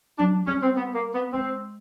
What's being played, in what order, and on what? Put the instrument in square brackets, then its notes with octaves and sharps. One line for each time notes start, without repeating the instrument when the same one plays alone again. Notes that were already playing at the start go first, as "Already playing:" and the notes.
[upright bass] F#3 [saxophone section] D4
[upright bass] G3 [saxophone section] C#4
[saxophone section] C4
B3
A#3
B3
[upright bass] G#3 [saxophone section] C4